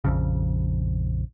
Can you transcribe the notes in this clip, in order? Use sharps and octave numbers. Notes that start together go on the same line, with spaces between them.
A#1 F2 C#3